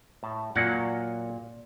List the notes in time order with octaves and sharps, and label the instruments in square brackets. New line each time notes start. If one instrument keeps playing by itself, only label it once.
[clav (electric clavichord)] A2 A5
[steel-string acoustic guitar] A#2 [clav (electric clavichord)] F#3 A#3 F#5